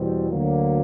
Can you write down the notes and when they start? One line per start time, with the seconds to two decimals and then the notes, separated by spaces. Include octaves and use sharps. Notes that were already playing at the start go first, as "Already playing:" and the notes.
Already playing: E2 B2 G3 C4
0.29 D2 D3 F#3 A#3